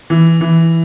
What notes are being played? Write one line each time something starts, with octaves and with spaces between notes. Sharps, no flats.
E3
E3